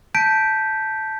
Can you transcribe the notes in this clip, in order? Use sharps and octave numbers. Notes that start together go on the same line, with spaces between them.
A5 G6 B6 D7